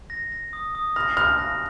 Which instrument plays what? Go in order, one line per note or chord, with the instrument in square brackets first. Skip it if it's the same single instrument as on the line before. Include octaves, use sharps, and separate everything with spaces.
[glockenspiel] A#6
A#6
D#6
D#6
[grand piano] F6 [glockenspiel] A#6
[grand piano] F6 [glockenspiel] F#6
[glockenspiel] A#6